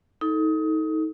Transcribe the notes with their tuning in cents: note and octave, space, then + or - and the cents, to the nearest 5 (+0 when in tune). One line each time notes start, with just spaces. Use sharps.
D#4 +25 A4 +0